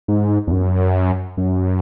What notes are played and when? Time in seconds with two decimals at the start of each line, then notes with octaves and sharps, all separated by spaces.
0.08 G#2
0.47 E2
0.51 F#2
1.37 F#2